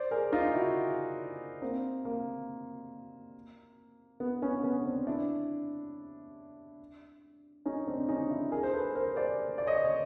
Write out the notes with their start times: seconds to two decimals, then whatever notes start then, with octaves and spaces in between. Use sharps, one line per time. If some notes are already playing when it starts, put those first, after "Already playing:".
Already playing: C5 D5
0.11 G#4 A#4
0.32 D#4 F4
0.54 E4 F#4
1.62 A#3 C4
2.05 A#3
4.20 B3
4.42 B3 C#4
4.63 B3 C#4
4.85 C4 D4
5.07 D4 E4
7.66 C#4 D#4
7.87 C4 D4
8.09 C#4 D#4
8.30 D4 E4
8.52 G#4 A#4
8.63 C5
8.73 A4 B4
8.95 A#4 C5
9.16 C5 D5
9.58 D5
9.67 C#5 D#5
9.85 C#5